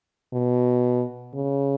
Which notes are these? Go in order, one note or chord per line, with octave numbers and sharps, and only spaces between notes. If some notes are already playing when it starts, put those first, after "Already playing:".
B2
C#3